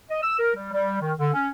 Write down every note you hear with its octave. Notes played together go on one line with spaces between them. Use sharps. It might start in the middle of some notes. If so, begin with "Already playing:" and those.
D#5
E6
A#4
G3
G3
D#3
D3
C#4